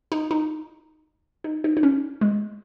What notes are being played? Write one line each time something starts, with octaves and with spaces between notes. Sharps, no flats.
D#4
D#4
D#4
D#4
D#4
C#4
G#3